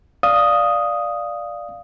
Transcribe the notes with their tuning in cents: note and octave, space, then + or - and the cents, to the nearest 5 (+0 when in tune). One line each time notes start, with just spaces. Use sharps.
D5 +0 F5 +0 D#6 +0